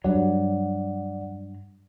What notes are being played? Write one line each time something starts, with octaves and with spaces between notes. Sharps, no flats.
G2 F#3 D5 F#5